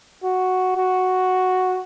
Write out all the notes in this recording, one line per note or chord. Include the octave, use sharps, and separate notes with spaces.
F#4
F#4